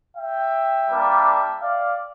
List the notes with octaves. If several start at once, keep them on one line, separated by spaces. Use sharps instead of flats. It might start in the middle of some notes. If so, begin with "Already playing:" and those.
E5 G5
G3 A#3 D4
D5 F5